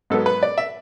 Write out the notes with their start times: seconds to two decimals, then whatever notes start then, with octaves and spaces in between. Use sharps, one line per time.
0.10 G#2 F#3 B3 A4
0.26 B4
0.43 D5
0.58 E5